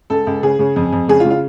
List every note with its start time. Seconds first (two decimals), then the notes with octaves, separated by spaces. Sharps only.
0.10 C#2 A4
0.27 C#2
0.43 C#3 G#4
0.59 C#3
0.76 F2
0.93 F2
1.08 C#3 G#4
1.20 F4
1.25 C#3
1.30 F4